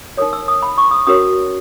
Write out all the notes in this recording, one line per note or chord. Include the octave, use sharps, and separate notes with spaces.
D#4 A#4 C#5 D#6
E6
D#6
B5
C#6
D#6
C#4 F#4 A#4 C#5 D#6